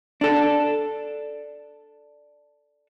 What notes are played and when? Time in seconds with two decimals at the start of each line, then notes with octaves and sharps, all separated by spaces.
0.21 D4 A4